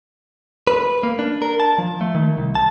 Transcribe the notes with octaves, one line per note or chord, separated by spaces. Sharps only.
B4
A#3
D4
A#4
A5
F3
A3
D#3
C2
A5